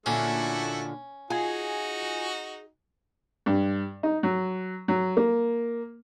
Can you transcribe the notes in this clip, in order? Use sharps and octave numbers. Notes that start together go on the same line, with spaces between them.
A#2 D3 A3 C#4 E4 F#4
D#4 F4 F#4 G#4 G#5
G2
D#4
F#3
F#3
A#3